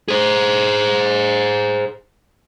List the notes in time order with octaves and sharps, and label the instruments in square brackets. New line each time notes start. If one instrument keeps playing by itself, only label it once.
[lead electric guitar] G#4 C5